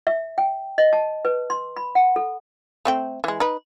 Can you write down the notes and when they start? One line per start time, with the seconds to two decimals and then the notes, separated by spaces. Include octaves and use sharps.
0.07 E5
0.38 G5
0.78 D#5
0.93 A5
1.25 B4
1.50 C6
1.76 B5
1.95 F#5
2.16 A4
2.85 A3 C4 G5
3.24 E3 G#3
3.40 D#4 B4